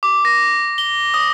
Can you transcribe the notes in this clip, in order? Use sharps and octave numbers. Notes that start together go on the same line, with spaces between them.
D6
A#6
G7
D#6